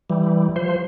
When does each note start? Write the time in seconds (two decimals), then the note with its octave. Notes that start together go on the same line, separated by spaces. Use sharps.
0.10 E3 G3
0.56 F3 C5